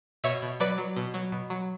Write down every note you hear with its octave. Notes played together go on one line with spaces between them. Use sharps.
B2 C#5 E5
B2
F#3 B4 D5
F#3
B2
F#3
B2
F#3